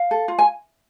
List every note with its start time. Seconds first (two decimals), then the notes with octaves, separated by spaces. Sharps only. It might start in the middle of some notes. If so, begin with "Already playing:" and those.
Already playing: F5
0.11 A4
0.28 F4
0.39 G#5